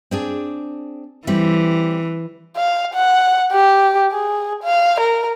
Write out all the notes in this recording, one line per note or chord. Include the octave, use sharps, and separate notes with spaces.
C4 D4 G#4
E3 G3 A3 C4
F5
F#5
G4
G#4
F5
A#4